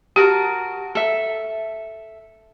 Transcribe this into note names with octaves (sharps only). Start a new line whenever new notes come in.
F#4 G4 A#4 A5
A4 E5